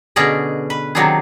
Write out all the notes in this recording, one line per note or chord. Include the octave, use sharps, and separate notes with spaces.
B2 D3 C#4 G#4 D5 D#5
B4
C3 D#3 F#3 D4 D#4 G#4